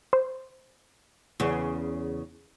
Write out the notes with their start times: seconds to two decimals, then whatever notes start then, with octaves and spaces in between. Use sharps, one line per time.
0.13 C5
1.40 E2 C#3